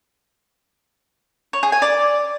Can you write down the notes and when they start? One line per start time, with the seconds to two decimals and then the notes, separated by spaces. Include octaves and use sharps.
1.53 C#5
1.63 G#4
1.72 G#5
1.82 D5